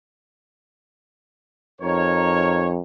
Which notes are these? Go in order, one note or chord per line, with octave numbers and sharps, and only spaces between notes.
F2 D#4 A#4 C#5